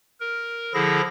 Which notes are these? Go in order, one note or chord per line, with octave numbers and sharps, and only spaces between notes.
A#4
D3 F3 E4 G#4 A4 A#6